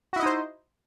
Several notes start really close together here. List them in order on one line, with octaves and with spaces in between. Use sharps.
F#4 E4 D#5 D#4 C5